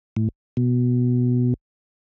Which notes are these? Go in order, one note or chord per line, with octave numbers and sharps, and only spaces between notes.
A2
B2